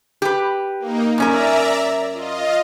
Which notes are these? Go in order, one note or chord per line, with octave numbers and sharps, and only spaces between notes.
G4 B4
A#3 D#4
F#2 C#4 A#4 D5 E5 A#5
F4 D#5